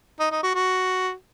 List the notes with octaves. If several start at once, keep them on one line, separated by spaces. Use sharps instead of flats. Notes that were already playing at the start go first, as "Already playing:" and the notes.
D#4
D#4
F#4
F#4